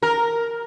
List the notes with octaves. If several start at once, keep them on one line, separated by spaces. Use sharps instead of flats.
A#4